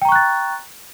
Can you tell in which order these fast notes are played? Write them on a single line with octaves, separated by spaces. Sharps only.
G5 A#5 C#6 F#6 A6